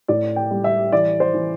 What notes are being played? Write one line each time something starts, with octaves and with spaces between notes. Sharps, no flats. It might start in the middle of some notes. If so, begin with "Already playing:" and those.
A2 D5
G5
G3
E5
E3 D5
C5
E3